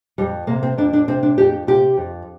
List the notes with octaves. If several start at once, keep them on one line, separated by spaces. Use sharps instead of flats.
F2 G3
C3 A#3
C4
F2 D4
D4
C3 C4
D4
F2 G4
C3 G4
F2